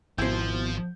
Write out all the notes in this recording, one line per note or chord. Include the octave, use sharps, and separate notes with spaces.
G#1 B2 F3 E4 C5 G6